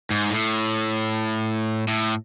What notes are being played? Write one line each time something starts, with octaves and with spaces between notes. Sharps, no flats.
G#2
A2
A2